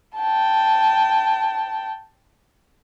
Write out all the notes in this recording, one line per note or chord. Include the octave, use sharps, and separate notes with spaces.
G5 A5